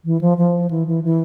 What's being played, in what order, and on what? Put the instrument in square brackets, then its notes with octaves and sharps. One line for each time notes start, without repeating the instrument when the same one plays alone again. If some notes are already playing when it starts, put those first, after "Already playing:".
[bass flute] E3
F3
F3
E3
E3
E3